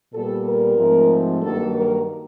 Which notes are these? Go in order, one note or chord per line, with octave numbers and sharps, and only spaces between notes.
A#2 G3 B3 A4
A#4
G#2 F3 A3 C4
G2 D#3 F#3 A#3 A4
A#4